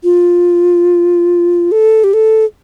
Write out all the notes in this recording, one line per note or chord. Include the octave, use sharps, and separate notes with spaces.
F4
A4
G4
A4